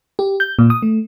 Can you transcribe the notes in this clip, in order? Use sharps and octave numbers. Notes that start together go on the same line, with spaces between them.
G4
G6
A#2
D#6
A3